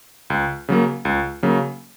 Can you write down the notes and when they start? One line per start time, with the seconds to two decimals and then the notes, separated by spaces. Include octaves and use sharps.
0.30 C#2
0.69 C#3 F#3 A#3
1.05 C#2
1.43 C#3 F#3 A#3